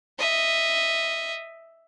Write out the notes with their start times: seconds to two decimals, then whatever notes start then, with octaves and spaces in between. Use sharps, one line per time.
0.19 D#5 E5